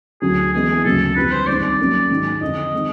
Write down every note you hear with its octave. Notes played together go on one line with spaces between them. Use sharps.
D2 D3 F#3 G#4
C3 E3 G#3 B3 G#4
D2 C#3 F#3 A#3 A4
F2 D3 G3 C4 B4
C5
C2 C3 D#3 G#3 D5
F#3 A#3 C#4
G#2 D#3 F#3
F2 D3 F3 D#5
D#3 G#3 C4